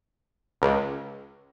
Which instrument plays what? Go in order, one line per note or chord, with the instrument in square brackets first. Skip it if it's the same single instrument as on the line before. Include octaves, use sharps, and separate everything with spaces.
[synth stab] C#2